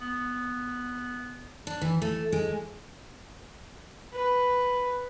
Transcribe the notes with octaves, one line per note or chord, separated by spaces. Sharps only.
B3
D4
E3
A3
G#3
B4